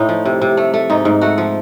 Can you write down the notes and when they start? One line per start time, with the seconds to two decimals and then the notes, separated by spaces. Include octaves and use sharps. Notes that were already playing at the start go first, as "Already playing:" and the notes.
Already playing: A2 D#4
0.09 F3
0.25 C3
0.42 C3
0.57 A3
0.74 A3
0.90 G#2 D#4
1.05 G#2
1.22 A3 F#4
1.38 F3